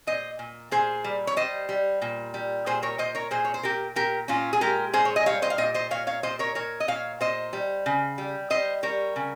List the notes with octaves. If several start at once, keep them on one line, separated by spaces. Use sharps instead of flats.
A#2 C5 D#5
A#2
A#2 G#4 C5
G3
C#5
G3 C5 D#5
G3
A#2
G3
A#2 G#4 C5
A#4 C#5
A#2 C5 D#5
A#4 C#5
A#2 G#4 C5
C#5
C5
A#2 G4 A#4
A#2 G4 A#4
A#2 C#4 F4
G#4
G#3 G4 A#4
A#2 G#4 C5
C#5
D#5
G3 C#5 F5
C5 D#5
F5
A#2 C5 D#5
C5 D#5
A#2 C#5 F5
C#5 F5
A#2 C5 D#5
A#4 C#5
A#2 A#4 C#5
D#5
A#2 C#5 F5
A#2 C5 D#5
G3
C#3
G3
G3 C5 D#5
G3 A#4 C#5
C#3